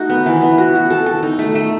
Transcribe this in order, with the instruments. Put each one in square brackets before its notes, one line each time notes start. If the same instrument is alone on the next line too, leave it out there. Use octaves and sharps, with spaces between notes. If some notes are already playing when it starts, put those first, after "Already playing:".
Already playing: [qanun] A3 D#4 F#4
B3
E3
B3
F#4
F#4
A4
A4
D#4
A3
A3